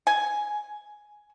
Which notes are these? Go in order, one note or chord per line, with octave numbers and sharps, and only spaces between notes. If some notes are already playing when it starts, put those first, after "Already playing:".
G#5